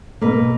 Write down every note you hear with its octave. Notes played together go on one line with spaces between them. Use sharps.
B2 A#3 B4